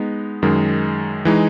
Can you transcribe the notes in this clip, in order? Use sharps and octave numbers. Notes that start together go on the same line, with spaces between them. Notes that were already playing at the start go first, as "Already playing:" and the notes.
Already playing: G#3 B3 D#4
F#2 D#3 G#3
E3 G#3 D#4